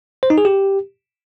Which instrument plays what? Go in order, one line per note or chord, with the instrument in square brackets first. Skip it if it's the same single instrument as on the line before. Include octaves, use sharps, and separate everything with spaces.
[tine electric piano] C5
D#4
G#4
G4